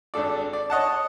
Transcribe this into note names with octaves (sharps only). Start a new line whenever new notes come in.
G#1 D4 A4 D5
D5
C#5 D#5 F#5 A5